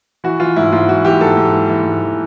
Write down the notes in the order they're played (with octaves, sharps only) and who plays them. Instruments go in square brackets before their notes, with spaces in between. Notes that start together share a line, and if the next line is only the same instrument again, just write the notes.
[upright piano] E3 F#4
E3 F4
G#2 E4
G#2 F4
E3 F#4
E3 G4
G#2 A4
G#2
E3
E3
G#2
E3